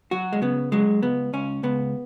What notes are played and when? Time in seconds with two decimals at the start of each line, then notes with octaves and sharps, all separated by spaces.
0.11 F#3 F#4
0.33 G#3
0.42 C#3 B3
0.72 F#3 G#3
1.03 C#2 B3
1.33 C#2 C#4
1.63 C#2 B3